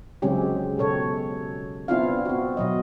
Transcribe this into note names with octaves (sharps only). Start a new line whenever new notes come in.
C#3 F#3 G#3 C4 C#4 G4
B2 A4 C#5
B3 C4 D4 E4 F4 F5
C4 F#4
B2 F#3 D#5